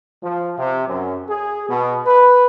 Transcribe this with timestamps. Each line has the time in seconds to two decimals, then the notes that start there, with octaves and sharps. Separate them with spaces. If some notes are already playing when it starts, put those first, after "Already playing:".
0.22 F3
0.57 C3
0.87 F#2
1.28 G#4
1.68 B2
2.06 B4